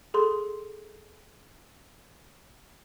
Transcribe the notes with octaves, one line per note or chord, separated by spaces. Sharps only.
G#4 A4 C6